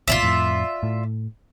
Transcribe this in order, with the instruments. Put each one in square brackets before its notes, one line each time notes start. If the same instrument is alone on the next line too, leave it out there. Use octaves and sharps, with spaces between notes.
[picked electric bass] A1 D2 B2 [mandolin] F4 D5 E5
[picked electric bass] F2 A2
A2